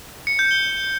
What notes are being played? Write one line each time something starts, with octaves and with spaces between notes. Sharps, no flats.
C#7
G6
G7